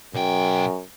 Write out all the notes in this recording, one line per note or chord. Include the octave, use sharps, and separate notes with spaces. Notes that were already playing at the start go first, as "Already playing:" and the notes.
B1 F#2 G5